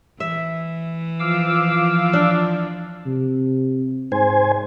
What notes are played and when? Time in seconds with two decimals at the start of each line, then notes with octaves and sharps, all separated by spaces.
0.20 E3 E5
1.19 F3 F5 D6 E6
2.13 D4
3.06 C3
4.12 G#2 C5 G#5